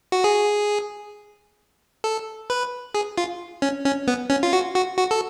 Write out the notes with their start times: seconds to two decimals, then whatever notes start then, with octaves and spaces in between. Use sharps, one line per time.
0.12 F#4
0.24 G#4
2.04 A4
2.50 B4
2.95 G#4
3.18 F4
3.62 C#4
3.85 C#4
4.07 B3
4.30 C#4
4.43 F4
4.53 F#4
4.75 F#4
4.98 F#4
5.11 A4